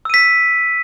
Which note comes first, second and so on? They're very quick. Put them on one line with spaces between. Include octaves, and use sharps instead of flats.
E6 D#7 B6